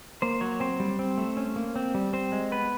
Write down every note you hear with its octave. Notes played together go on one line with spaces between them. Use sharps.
A#3 C5
F#3 C#5
C4 C5
G3
C4
A3
C#4
A#3
C4
G3
C4 C5
G#3
B3 B4